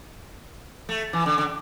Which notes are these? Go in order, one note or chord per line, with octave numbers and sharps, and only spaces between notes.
A3
E3
D3
D3